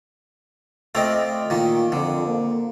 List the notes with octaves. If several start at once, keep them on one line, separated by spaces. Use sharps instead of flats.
A3 C4 F4 D5 D#5
A#2 D#3
F2 D3
A#3